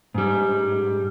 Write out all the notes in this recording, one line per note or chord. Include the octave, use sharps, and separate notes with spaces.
G#2 G3